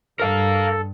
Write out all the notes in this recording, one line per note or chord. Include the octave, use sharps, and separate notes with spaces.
G2 A4 A#4 F5